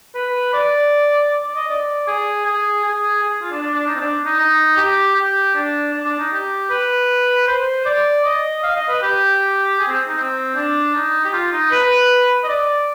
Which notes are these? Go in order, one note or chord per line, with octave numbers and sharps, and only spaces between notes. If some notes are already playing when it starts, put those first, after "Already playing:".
B4
D5
D5
D#5
D5
G#4
G#4
G#4
G#4
F4
D4
D4
D4
D#4
C4
D4
D#4
D#4
G4
G4
D4
D4
D4
D#4
G4
B4
C5
D5
D#5
F5
D#5
B4
G4
G#4
C4
D#4
C4
D4
D#4
G4
F4
D#4
B4
D#5
D5